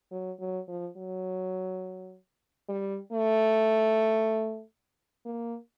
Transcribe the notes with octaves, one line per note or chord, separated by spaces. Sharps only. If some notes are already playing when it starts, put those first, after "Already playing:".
F#3
F#3
F3
F#3
G3
A3
A#3